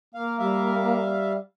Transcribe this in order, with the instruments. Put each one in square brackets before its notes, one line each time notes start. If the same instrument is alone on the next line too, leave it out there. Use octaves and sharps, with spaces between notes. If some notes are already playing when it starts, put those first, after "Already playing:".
[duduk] A#3 [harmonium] F5
[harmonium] G3 E5 F5